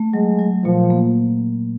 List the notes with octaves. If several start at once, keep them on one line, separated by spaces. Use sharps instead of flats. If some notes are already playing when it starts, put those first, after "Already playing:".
Already playing: A3
F#3 G#3
F#3
A#2 F3
A#3